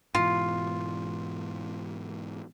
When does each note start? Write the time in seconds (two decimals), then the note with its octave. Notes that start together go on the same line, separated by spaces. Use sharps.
0.15 G#2 B2 E3 F4